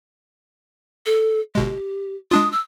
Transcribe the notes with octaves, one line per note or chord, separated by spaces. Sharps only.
A4
G1 B2 G#3 G4
G#3 D4 F4 D#6
E6